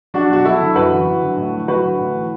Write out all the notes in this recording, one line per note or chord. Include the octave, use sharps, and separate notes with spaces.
F#3 D4 F#4
B2 F#4
F#3 E4 A4
D3
F#2 F#4 B4
E3
F#3
D3
A2
F#3
F#3 F#4 B4
D3
A2
E3